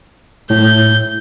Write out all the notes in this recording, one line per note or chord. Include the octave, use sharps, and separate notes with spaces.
A2 G6